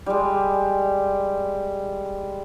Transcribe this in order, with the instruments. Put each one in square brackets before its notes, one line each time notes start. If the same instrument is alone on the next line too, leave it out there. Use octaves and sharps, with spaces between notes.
[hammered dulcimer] G3 G#3